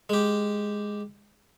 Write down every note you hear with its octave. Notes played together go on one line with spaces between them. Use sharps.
G#3 G4